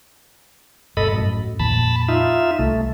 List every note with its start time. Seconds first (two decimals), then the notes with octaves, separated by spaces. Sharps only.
0.97 G1 G2 B2 A4 D#5 B5
1.12 F#2 A2
1.59 F2 A#2 D#3 A5 B5
2.08 D#4 F4 E5
2.59 C2 A3